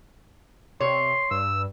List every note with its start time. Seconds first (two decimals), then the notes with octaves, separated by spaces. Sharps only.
0.80 C3 C#5 C6
1.31 G2 E6